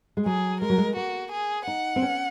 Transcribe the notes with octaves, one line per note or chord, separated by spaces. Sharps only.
G#3
F#3 G#4
G#3 A#4
F#3
G#3
A#3 F#4
G#4
D#4 F#5
C4
C#4